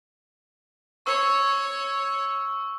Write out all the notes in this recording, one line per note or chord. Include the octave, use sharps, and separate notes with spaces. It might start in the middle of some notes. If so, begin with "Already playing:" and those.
C#5 C#6 E6